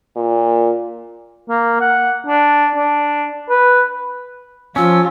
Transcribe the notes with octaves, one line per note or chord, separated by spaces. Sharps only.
A#2
A#3
F#5
D4
D4
B4
F3 C#4 F4 E6